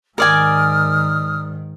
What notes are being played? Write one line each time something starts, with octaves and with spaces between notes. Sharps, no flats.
G#2 D#3 A#4 D5 G#5 D#6 F6